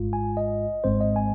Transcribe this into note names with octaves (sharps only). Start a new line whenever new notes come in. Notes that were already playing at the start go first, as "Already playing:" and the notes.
Already playing: G#1 G#2 G#3 F4
G#5
D#5
G#1 G#2 G#3 C4 C5
D#5
G#5